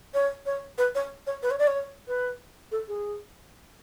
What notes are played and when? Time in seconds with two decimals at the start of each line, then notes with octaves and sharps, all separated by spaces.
0.14 C#5
0.46 C#5
0.78 B4
0.95 C#5
1.27 C#5
1.43 B4
1.51 C#5
1.59 D5
1.67 C#5
2.08 B4
2.72 A4
2.88 G#4